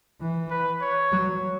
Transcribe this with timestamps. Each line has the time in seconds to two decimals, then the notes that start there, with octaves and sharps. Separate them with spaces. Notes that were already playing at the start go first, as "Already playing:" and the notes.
0.21 E3
0.50 B4
0.81 C#5
1.12 F#3